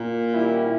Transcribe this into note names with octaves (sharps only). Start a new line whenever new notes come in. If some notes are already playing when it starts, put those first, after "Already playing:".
Already playing: A#2
D#3 G3 A#3 C#4 E4